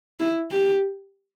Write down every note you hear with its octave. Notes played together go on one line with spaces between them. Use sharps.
E4
G4